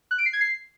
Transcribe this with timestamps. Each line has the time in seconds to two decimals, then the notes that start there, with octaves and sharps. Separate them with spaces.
0.11 F#6
0.18 D7
0.26 C7
0.33 G#6
0.41 C7